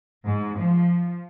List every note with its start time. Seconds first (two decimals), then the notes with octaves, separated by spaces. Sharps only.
0.24 G#2
0.58 F3